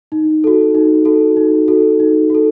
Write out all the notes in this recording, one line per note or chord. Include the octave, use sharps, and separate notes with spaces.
D#4
F#4 A4
D#4
F#4 A4
D#4
F#4 A4
D#4
F#4 A4